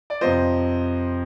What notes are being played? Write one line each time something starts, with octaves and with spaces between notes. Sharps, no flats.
D5
F2 C3 F3 C5 D#5